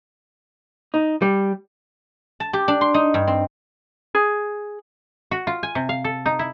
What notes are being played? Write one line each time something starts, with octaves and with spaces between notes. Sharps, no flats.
D#4
G3
A5
G4
D4
C6
D#4
G2
C4
G#4
F#4
F4
G#5
C3
F5
A4
D#4
E4